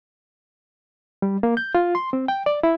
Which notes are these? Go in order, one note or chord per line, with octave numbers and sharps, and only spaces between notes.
G3
A#3
G6
F4
C6
C4
G5
D5
E4